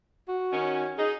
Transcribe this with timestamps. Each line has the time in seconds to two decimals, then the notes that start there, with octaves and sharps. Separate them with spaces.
0.28 F#4
0.52 D#3 C#4
0.98 D#4 G#4